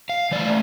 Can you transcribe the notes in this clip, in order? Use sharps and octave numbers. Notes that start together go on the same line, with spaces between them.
F5
E3 A3 D5